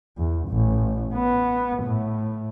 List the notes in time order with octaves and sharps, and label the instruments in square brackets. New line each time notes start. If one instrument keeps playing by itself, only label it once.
[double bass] E2
A1
B3
A2